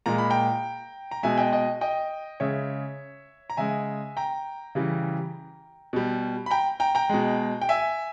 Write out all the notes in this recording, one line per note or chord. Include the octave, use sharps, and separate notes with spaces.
A#2 G#3 A#5
B5
G5 A#5
A#5
B2 G#3 E5 G#5
D#5 G5
D#5 G5
D#5 G5
C#3 G#3 C#5 E5
A#5
C#3 G#3 E5 G#5
G5 A#5
C#3 E3 G3
B2 G3
B5
G5 A#5
G5 A#5
G5 A#5
B2 G#3
G5
E5 G#5